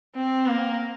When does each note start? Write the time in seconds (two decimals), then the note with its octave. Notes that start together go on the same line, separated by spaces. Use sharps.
0.15 C4
0.47 A#3